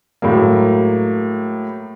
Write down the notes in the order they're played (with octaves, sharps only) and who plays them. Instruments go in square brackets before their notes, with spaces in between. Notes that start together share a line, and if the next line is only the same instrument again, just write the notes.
[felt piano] A2 F#3 G#3 A#3